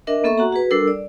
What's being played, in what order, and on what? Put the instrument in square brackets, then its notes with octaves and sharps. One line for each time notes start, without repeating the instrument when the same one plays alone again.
[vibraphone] D4 A#4 D#5 E5
A#3 B3 A4 E5 C#6
F#4 F#5 A#5
F#4 G#4 B4
G3 D4 A4 A#4 E6
D5